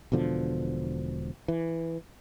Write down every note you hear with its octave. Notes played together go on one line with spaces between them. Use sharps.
E1 B2 D3 F3
E3